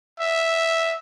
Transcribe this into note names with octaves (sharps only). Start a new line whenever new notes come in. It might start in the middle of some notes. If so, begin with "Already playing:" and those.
E5